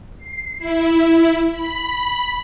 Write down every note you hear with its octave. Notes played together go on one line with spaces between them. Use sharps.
C7
E4
B5